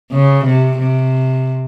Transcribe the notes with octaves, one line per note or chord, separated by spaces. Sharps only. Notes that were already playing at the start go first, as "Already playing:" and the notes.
C#3
C3
C3